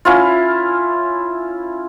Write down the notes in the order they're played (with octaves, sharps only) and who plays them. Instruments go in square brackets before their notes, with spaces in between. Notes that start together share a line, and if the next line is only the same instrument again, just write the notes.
[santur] C#4 E4 F4